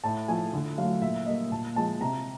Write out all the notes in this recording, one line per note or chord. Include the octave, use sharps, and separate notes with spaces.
A2 A5
F3 A3 G#5
D3
F#3 A3 F5
A#2 E5
G3 A#3 D#5
A#2 A5
F3 G#3 A5
C3 A#5